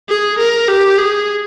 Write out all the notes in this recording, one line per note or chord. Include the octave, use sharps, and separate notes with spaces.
G#4
A#4
G4
G#4